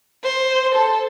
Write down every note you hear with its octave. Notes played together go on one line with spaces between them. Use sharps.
C5
A4